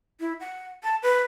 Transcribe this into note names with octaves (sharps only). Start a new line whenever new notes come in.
E4
F#5
A5
B4